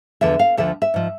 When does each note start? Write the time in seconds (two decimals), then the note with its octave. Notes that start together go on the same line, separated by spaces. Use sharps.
0.21 E2 D3 F3 E5
0.39 F5
0.57 D2 D3 F3 E5
0.82 E5
0.94 G#2 F3